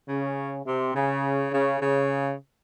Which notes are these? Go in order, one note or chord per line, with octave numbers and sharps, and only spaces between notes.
C#3
C3
C#3
C#3
C#3